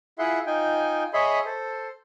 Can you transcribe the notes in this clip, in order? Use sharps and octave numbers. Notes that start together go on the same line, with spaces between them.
E4 F4 G#4 E5 F#5 C6
D#4 F4 G5 G#5
G#4 C#5 D#5 E5 B5 C6
A4 C5